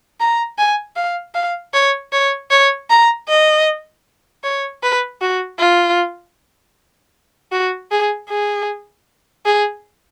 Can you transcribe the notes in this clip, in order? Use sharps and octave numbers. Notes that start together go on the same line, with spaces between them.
A#5
G#5
F5
F5
C#5
C#5
C#5
A#5
D#5
C#5
B4
F#4
F4
F#4
G#4
G#4
G#4